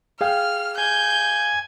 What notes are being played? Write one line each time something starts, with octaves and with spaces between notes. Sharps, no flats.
G#4 F5 G5 F6
G#5 G6